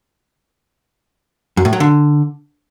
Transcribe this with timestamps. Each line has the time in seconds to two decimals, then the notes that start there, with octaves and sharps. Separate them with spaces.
1.57 F#2
1.65 A2
1.73 F#3
1.80 D3